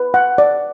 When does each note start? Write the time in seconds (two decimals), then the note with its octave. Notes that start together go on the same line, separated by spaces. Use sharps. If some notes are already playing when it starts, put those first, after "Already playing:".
Already playing: B4
0.14 F#5
0.38 D5